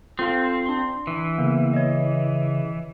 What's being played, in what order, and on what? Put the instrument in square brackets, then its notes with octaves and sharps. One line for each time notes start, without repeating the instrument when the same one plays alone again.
[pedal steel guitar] C4 [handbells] F4 A4 F5
[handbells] D4 C6
[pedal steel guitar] E3
[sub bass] C#3 [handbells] A#3 B3
[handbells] C#5 D#5